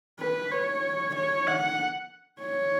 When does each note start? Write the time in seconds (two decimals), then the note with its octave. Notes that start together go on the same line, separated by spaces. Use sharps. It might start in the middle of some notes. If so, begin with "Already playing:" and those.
0.20 B4
0.52 C#5
1.16 C#5
1.47 F#5
2.41 C#5